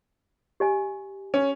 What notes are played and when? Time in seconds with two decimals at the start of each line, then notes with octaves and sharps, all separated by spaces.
0.60 G4 D#5 G#5
1.34 C#4